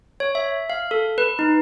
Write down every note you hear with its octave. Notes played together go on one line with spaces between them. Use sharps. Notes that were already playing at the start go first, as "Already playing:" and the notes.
C#5
E5
F5
A4
B4
D#4